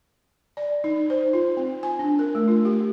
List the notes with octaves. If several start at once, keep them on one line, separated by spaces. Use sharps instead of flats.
D5
D#4
C5
F4
C4
G#5
D4
A#4
A3
F4
G4